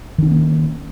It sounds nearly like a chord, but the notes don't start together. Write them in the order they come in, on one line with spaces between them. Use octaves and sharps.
D#3 D4 C#4 A#3